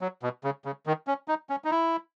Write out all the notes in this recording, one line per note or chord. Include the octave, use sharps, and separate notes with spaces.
F#3
B2
C#3
C#3
D#3
C#4
D#4
C#4
D#4
E4